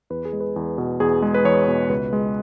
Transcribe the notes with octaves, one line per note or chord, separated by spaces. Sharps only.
E2 B4
G#4
G#3
B4
E2
B2
E2 G#4
G#3
B4
E2 C#5
B2
C#2 B4
G#3